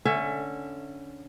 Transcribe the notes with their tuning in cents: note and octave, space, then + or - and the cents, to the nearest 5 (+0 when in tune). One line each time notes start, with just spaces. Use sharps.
D3 +0 C#4 +0 E5 +20